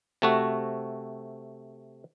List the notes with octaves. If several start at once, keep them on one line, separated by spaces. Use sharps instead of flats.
C3 A3 F#4